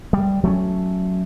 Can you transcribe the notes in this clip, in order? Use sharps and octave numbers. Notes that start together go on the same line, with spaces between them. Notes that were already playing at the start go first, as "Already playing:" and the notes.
G3
F#3 A3 A#3 C#4